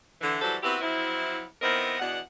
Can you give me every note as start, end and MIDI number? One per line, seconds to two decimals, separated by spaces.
0.22 0.38 50
0.22 0.38 52
0.42 0.57 52
0.42 0.57 54
0.42 0.57 55
0.42 0.57 66
0.42 0.57 69
0.42 0.57 72
0.63 0.77 59
0.63 0.77 60
0.63 0.77 64
0.63 0.77 66
0.63 0.77 67
0.63 0.77 71
0.81 1.43 53
0.81 1.43 54
0.81 1.43 60
0.81 1.43 64
1.62 1.99 51
1.62 1.99 59
1.62 1.99 60
1.62 1.99 64
1.62 1.99 70
1.62 1.99 75
2.00 2.19 40
2.00 2.19 47
2.00 2.19 62
2.00 2.19 78